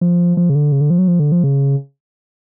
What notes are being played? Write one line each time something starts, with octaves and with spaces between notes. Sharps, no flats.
F3
F3
C#3
D3
C#3
D3
F3
F#3
F3
D3
F3
C#3